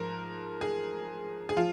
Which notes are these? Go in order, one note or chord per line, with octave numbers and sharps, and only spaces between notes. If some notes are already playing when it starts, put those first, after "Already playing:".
Already playing: G#2 F3 A#4
G#4
G#4
F3 F4